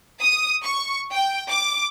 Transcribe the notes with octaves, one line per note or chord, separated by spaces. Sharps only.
D#6
C#6
G5
D6